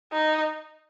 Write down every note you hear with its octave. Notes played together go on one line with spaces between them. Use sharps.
D#4